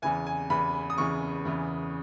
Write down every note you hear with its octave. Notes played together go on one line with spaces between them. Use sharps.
E2 C#3 E3 G#5
G#5
E2 C#3 E3 B5
D#6
E2 C#3 E3 C#6
E2 C#3 E3